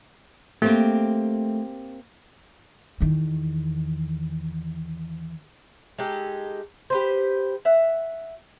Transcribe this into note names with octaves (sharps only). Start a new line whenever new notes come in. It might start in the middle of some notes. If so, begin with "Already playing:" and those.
A3 A#3 C4 G4
E2 D#3
G#3 D#4 G4 A4
G4 B4 C5
E5 F#5